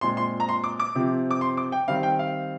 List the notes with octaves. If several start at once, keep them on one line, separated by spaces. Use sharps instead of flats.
A#2 G#3 C4 C6
C6
A#5
C6
D6
D6
C3 F3 C4
D6
C6
D6
G5
D#3 G3 C4 F5
G5
F5